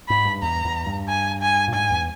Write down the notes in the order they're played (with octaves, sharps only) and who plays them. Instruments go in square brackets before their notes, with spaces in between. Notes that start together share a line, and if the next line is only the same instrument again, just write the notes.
[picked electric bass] G#2 [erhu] B5
[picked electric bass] G2
[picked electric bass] E2 [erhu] A#5
[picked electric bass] E2
G2
[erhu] G#5
G#5
[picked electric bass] A#2
[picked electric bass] G#2 [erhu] G#5
[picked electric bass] E2